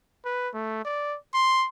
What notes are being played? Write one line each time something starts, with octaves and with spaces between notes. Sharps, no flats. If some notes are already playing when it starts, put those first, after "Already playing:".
B4
A3
D5
C6